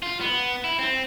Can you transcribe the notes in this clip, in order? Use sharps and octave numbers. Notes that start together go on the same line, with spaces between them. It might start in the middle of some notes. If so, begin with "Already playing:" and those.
F4
B3
E4
C4